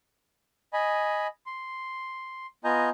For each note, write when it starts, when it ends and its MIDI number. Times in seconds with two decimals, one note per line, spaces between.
0.73 1.27 75
0.73 1.27 80
0.73 1.27 83
1.46 2.47 84
2.64 2.90 59
2.64 2.90 65
2.64 2.90 75
2.64 2.90 80
2.64 2.90 82
2.64 2.90 91